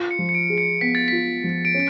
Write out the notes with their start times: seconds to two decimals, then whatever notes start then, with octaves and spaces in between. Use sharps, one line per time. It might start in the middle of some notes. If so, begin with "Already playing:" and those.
Already playing: F4
0.11 C#7
0.19 F3
0.29 C#7
0.35 D7
0.50 G#4
0.58 C#7
0.81 B3 B6
0.95 A6
1.08 F4 B6
1.44 F3
1.65 D7
1.74 C#4